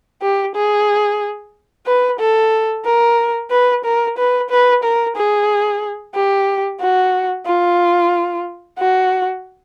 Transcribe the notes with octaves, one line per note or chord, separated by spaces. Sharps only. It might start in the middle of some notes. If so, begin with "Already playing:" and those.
G4
G#4
B4
A4
A#4
B4
A#4
B4
B4
A#4
G#4
G4
F#4
F4
F#4